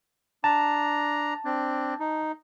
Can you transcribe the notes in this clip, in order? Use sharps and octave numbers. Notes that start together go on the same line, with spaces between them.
D4 A5 A#5
C4 D4
D#4